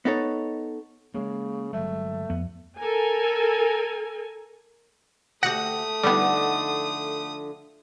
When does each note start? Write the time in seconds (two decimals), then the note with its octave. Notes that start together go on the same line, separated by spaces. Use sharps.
0.05 B3 D#4 A4 C#5
1.14 C#3 G#3 A#3
1.73 G1 F#3 G#3 A3
2.30 F2 B3
2.78 A4 A#4 G#5
5.43 D2 A3 F#4 G4 F#5 D#6 A#6 C#7
6.03 D3 F3 G3 B3 D#4 D5 F#5